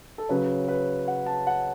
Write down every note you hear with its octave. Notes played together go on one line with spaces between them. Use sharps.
A4
C#3 F#3 C#4 B4
B4
F#5
A5
F#5